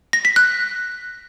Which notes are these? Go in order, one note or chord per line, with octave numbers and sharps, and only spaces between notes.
A#6
B6
F#6